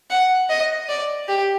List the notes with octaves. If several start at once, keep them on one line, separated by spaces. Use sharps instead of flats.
F#5
D#5
D5
G4